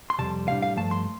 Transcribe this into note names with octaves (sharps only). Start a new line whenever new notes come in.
C6
F2 C3 G3 A5
A2 G3 D4 F5
F5
G2 F3 A3 A5
C6